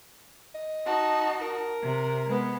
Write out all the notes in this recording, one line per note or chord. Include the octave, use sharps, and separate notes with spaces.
D#5
D#4 F#4 A5
A#4
C3
G#3 B3